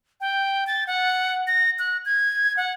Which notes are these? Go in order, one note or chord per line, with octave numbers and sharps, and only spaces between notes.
G5
A6
F#5
A#6
F#6
G#6
F#5